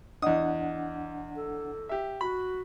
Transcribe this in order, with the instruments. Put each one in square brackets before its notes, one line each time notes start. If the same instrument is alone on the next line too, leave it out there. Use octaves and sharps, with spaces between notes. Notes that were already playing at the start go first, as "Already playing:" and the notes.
[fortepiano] E2 D#6 [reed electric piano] D4 F#5 [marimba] D#5
[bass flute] A4
[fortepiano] G4 E5
[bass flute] F#4 [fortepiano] B5